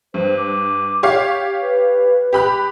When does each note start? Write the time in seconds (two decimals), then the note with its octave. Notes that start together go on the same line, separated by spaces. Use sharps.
0.14 G2 C5
0.37 D6
1.03 G4 C#5 F5
1.62 B4
2.33 G4 B5 F#6